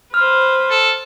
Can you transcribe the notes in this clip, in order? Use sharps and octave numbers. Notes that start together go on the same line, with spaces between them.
B4 C5 F6
A4